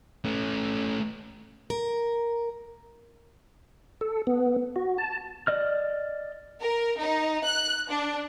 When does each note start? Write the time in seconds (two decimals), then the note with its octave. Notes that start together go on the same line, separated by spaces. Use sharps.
0.24 A3 C#4
1.70 A#4
4.01 A4
4.27 B3
4.76 F#4
4.98 A5
5.47 D5 D#5 F6
6.60 A#4
6.97 D#4
7.44 F#6
7.88 D4